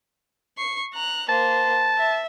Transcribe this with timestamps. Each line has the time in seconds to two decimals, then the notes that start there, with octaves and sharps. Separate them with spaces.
0.58 C#6 C7
0.94 A#5 F#6
1.29 A#3 C5 A5
1.97 E5